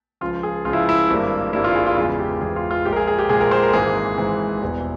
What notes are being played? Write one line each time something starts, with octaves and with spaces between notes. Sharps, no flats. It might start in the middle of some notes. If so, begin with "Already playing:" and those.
C#2 C#3 F3 F4
G#4
C#2 C#3 F3 F4
E4
E4
G#1 G2 G3 A#3
G#1 G2 G3 A#3 E4
F4
G#4
F4
E2 C#3 E3 G#3 F4
G4
E2 C#3 E3 G#3 G#4
F4
F4
A#1 A#2 G#3 G4
A#4
G#4
G#4
G4
A#1 A#2 G#3 G#4
A#4
C5
A#4
G#1 G#2 E3 A#3 G#4
G#1 G#2 E3 A#3
E1 E2 E3 G3